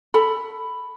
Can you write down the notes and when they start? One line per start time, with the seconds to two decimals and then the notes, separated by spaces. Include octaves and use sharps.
0.14 A4 B5